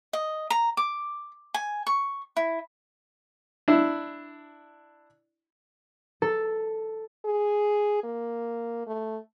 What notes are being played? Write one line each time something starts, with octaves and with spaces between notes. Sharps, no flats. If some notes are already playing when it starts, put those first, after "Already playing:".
D#5
A#5
D6
G#5
C#6
E4
D4 E4
A4
G#4
A#3
A3